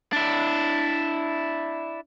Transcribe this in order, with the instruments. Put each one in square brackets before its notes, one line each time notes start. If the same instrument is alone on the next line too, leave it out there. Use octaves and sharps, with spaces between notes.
[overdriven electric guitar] D4 E4